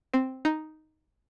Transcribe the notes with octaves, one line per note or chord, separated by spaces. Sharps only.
C4
D#4